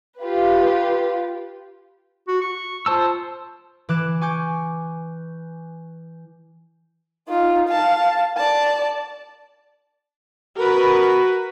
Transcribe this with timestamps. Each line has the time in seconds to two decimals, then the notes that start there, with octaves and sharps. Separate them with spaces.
0.19 F4 G4 B4
2.28 F#4
2.41 C#6
2.86 F4 C5 A5 E6
3.89 E3 D6 F#6 E7
4.21 G#5 C#6 D6 G6
7.28 D#4 F4
7.68 F5 A5
8.37 D5 A5
10.57 F#4 A#4 B4